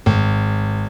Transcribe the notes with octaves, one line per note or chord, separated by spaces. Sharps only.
G#1